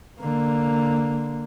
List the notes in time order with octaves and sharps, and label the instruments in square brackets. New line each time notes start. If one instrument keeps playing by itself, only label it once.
[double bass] D3 A#3